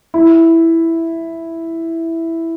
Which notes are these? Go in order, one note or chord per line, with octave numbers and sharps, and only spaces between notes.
E4